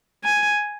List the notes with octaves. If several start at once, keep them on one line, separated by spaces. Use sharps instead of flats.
G#5